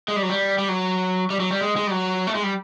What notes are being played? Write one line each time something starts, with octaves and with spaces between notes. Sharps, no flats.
G#3
G3
F#3
G3
G3
F#3
G3
F#3
G3
G#3
G#3
G3
F#3
A3
G#3
G3